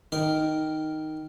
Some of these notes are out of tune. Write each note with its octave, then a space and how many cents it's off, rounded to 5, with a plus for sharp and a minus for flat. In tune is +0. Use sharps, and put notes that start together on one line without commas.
D#3 +0 A#4 +0 D#6 +0